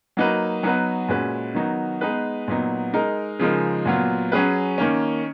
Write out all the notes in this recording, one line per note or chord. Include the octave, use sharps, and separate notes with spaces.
F#3 A#3 D#4 F#4 B4
F#3 B3 D#4 F#4 B4
A#2 G#3 C#4 F#4 B4
D#3 F#3 B3 D#4 F#4
G#3 B3 D#4 G#4 B4
A#2 F#3 B3 D#4
G#3 D#4 A#4
C#3 F3 G#3 D#4 A#4
A#2 F#3 B3 F4
F#3 C#4 G#4 B4
D#3 A#3 C#4